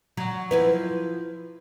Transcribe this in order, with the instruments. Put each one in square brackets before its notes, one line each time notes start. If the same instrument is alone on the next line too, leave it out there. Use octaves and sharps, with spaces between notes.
[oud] F#3
F3 E4 B4